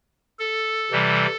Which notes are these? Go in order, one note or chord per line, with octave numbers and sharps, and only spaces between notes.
A4
C3 E3 G3